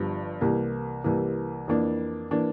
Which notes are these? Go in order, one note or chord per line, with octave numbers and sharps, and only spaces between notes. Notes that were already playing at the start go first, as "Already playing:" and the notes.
Already playing: G1 G2 F3
C2 C3 E3 A#3
C2 C3 E3 A#3
F2 E3 A#3 D4
E3 A#3 D4